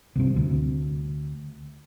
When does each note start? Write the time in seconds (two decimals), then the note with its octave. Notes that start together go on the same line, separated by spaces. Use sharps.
0.16 C2 G2 C3
0.36 D2